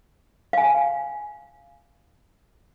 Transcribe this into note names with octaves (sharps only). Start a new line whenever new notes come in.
F5 G#5